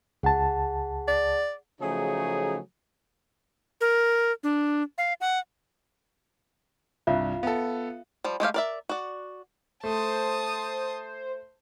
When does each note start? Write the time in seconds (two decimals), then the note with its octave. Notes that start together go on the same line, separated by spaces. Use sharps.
0.23 C#2 G#4 F#5 A5
1.08 D5
1.81 C#3 F3 F#3 A3 D#4 G#4
3.81 A#4
4.43 D4
4.98 F5
5.21 F#5
7.07 C2 G2 F4 E5 F5
7.43 B3 A4 F5
8.24 F3 G3
8.40 G#3 A3 G4 F5
8.54 A#4 D5 E5
8.89 F#4 D5
9.84 A3 C5 A5 D#6